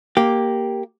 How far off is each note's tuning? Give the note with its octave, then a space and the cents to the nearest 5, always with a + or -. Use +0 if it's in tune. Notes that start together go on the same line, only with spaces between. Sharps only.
A#3 +0 G4 +0